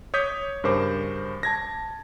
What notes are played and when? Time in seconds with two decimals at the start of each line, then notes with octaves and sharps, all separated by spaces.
0.14 C#5 D6 D#6 G6 B6
0.64 G2 C#3 A#4 C5 D6
1.43 A5 G#6 A#6